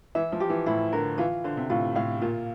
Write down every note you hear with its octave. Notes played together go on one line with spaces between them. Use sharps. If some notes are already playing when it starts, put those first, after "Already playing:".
E3 E5
F3
G4
E3
A2 E4
D3 A#4
E3 F4
D3 C5
C3
A2 F4
A2 F5
A#2 F4